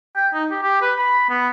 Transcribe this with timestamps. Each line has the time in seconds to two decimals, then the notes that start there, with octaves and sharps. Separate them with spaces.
0.16 G5
0.34 D#4
0.51 G4
0.63 G4
0.82 B4
0.98 B5
1.29 B3